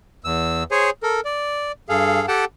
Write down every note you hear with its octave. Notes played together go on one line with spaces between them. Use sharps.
E2 E6
G#4 C5 C#5 G#5
A4 A#4
D5
G2 G#4 A4 F5
G4 A4 F#5 G5 A5